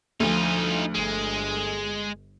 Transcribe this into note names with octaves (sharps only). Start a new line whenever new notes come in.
D2 F3 D#4 F4
G1 G#3